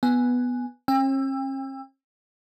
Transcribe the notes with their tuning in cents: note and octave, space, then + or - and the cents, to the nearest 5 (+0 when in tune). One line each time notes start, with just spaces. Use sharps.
B3 +0 G#5 +0
C#4 -45 G5 +35 E6 +15